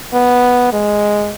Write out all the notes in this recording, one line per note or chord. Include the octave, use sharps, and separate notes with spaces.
B3
G#3